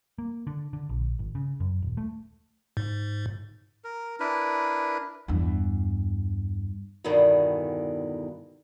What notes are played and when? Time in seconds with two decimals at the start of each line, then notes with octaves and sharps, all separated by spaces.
0.18 A#3
0.47 D3
0.73 D3
0.89 A#1
1.19 G#1
1.35 C#3
1.60 F#2
1.82 D#1
1.97 A3
2.77 G#2
3.84 A#4
4.20 D4 E4 A#4 B4
5.28 E2 G2
7.04 E2 G2 B2 D3 D#3